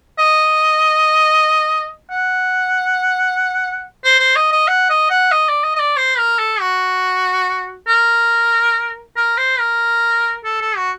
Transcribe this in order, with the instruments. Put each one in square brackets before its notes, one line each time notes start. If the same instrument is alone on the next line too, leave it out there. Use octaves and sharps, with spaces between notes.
[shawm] D#5
F#5
C5
C5
D#5
D#5
F#5
D#5
F#5
D#5
D5
D#5
D#5
D5
C5
A#4
A4
F#4
A#4
A#4
C5
A#4
A4
A4
F#4